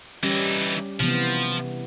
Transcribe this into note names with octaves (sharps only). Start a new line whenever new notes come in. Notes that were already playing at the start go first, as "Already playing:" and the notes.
E3 G3 C#4 D#4 G4
C3 E3 F3 B3